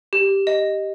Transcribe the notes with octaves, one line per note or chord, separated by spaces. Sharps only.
G4
D#5